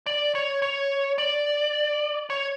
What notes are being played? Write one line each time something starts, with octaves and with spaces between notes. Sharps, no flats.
D5
C#5
C#5
D5
C#5